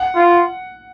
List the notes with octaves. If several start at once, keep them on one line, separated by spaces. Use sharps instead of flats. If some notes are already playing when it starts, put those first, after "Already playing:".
Already playing: F#5
F4